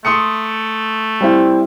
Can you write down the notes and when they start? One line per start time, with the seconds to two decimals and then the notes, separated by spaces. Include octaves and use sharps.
0.05 A3 C6 D#6 C#7
1.21 G3 C4 E4